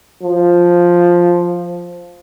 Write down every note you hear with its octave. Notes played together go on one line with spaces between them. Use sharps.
F3